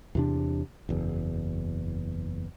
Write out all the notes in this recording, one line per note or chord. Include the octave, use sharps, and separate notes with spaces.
E2 C3 D4
F#1 E2